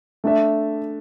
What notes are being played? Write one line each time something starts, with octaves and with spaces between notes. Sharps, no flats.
A3 D4 A4 E5